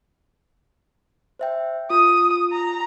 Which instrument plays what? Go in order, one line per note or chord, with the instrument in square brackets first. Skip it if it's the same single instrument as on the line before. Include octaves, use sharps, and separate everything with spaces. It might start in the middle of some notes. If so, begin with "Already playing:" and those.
[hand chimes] C5 E5 G5
[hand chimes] F4 [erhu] D#6
[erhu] A#5